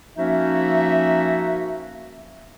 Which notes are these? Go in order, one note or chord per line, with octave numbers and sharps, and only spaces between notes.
F3 A#3 C#4 D#4 F#4 E5